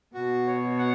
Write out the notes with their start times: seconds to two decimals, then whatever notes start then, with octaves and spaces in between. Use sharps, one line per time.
0.14 B2 F#4
0.47 C#5
0.78 F#5